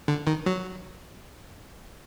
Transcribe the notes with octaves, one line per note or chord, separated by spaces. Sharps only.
D3
D#3
F#3